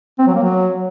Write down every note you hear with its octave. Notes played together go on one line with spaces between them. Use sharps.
C4
F#3
A#3
F#3